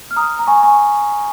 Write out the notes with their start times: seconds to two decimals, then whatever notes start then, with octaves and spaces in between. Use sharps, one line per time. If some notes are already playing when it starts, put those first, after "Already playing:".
0.11 F6
0.16 A#5 D#6
0.39 A#5
0.47 G#5 C#6
0.63 G#5 C#6